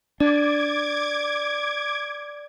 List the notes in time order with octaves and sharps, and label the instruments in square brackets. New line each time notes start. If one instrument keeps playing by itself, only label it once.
[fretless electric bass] D4 [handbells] D5 [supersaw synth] D6 G#6